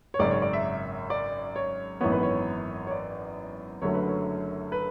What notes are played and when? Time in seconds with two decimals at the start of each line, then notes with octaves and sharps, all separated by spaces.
0.14 C#5
0.19 G#1 F#2 C#3 D5
0.31 C#5
0.42 D5
0.53 E5
1.10 D5
1.56 C#5
2.01 G#1 F#2 E3 B3 C#5
2.12 B4
2.23 C#5
2.87 C#5
2.91 D5
3.82 F#1 F#2 D3 F#3 A3 C#5
3.94 B4
4.08 C#5
4.72 B4